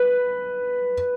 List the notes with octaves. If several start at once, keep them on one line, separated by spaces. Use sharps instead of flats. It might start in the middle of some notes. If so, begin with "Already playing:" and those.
Already playing: B4